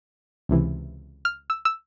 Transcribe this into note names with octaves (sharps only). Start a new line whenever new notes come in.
C#2 C3 E3
F6
E6
E6